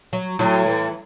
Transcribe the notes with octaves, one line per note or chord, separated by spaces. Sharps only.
F#3
A2 F#3
E3